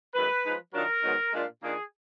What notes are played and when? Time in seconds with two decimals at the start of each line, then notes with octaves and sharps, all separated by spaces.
0.14 F#2 D#3 G#3 B4
0.44 F3 G#3 D#4
0.74 D#3 F#3 D4 F4 A#4
1.03 G#2 D#3 F#3 B3 D#4
1.33 A#2 G#3 D4 F4
1.63 D#3 A#3 D4 F4 G#4